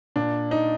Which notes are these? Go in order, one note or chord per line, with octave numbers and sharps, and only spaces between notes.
A#2 D4
D#4